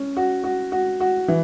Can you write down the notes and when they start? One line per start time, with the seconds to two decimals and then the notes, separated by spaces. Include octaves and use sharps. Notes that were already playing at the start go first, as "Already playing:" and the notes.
Already playing: C#4
0.17 F#4
0.44 F#4
0.72 F#4
1.00 F#4
1.28 E3